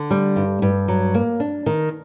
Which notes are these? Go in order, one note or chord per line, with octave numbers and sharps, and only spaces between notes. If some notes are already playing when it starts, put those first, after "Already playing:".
Already playing: D3
G3
G2
G2
F#3
A#3
D4
D#3